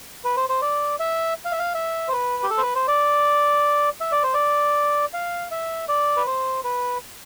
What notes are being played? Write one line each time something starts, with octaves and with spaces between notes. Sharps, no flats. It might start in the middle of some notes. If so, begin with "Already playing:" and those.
B4
C5
C5
D5
E5
F5
E5
F5
E5
C5
B4
G4
A4
C5
B4
C5
D5
E5
D5
C5
D5
F5
E5
D5
B4
C5
B4